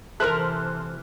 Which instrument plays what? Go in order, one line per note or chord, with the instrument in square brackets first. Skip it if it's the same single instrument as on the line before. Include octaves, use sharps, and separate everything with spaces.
[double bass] C3 E3 [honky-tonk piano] A4 C5 F6 [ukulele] A#4 E5 [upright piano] F#6